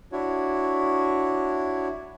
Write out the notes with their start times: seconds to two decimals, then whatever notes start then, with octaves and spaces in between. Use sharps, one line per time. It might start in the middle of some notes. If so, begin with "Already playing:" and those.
0.12 D4 E4 F#4 C#5